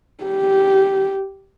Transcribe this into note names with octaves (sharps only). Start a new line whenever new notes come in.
G4